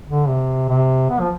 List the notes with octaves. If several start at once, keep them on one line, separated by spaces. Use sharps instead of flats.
D3
C3
C3
B3
F3